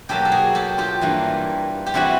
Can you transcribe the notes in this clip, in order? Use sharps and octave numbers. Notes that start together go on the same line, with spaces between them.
B2 F#3 A#3 G4 A4
A4
F#4 G#4
G4 A4
F4 G4
G2 E3 G3 A#3
G4
C3 E3 G3 E4 F#4